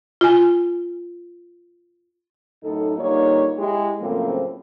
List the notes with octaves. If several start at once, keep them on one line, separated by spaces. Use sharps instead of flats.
F4 G#5
F#2 A2 D#4 A4
D3 G3 A#3 D#4 F4 C#5
G#3 E4 G4
F#2 A2 C#3 F3 A#3 C4